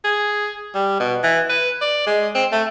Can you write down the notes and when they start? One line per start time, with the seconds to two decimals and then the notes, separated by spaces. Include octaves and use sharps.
0.04 G#4
0.74 G3
1.00 B2
1.23 E3
1.49 B4
1.81 D5
2.07 G#3
2.35 C4
2.52 A3